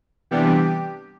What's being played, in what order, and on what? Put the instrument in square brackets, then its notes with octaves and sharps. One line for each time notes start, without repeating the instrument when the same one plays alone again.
[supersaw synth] C3 E3 G3 B3 D4 G4